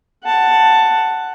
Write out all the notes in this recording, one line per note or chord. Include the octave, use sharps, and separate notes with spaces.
F#5 A5